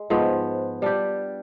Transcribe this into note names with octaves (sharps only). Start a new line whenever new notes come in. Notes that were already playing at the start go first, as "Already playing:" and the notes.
Already playing: G#3
G#2 F3 B3
G3 D4 G4